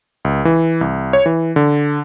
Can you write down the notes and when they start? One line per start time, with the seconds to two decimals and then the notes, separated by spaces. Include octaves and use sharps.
0.25 C#2
0.45 E3
0.81 C2
1.13 C#5
1.26 E3
1.56 D3